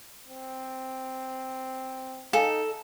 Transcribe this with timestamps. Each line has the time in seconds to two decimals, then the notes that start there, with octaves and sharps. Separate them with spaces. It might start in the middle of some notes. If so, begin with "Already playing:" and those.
0.28 C4
2.33 D#4 A4 F5 G#5